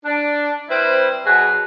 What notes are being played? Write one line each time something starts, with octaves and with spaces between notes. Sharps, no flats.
D4
G3 C4 E4 B4 C5
B2 F#3 F#4 G#4 B4